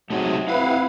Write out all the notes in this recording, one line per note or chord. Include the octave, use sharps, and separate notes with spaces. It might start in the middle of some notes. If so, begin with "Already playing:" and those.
C3 F#3 A3 D#4 G#4
C4 E4 G4 B4 F5 F#5